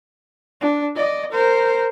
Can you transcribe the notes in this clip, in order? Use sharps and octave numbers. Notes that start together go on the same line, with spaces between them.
D4
D5 D#5
A#4 C5